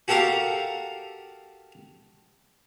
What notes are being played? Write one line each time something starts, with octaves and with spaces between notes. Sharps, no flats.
F#4 G4 A4 A#4 F5